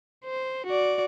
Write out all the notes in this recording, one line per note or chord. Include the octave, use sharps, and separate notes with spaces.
C5
F#4 D5